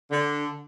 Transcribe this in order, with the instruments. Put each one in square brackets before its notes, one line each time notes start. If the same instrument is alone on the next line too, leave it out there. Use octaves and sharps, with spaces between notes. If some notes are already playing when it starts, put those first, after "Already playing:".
[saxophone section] D3